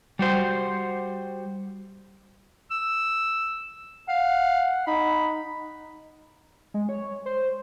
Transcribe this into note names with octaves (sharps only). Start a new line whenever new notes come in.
G3 F#4 C5
E6
F5 F#5
D#4 B5
G#3
C#5
C5